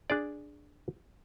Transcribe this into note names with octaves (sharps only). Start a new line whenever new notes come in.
D4 G#4 D5